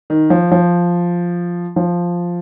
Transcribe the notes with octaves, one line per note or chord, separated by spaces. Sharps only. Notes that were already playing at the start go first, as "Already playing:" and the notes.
D#3
F3
F3
F3